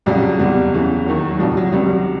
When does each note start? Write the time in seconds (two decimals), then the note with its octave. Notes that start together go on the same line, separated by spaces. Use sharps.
0.06 F#1 F2 C#3 F#3 G3
0.40 F#1 E2 C3 G3
0.73 E2 C#3 E3
1.06 D#2 D#3 F#3
1.30 F#3
1.39 F#1 F2 C3 F3 G3
1.57 F#3
1.72 C#2 C3 D#3 F#3 G3
1.89 F#3